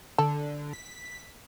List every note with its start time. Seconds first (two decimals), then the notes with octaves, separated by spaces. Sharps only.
0.18 D3 A4
0.73 B6